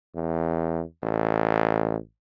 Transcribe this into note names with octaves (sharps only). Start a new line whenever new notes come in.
E2
A1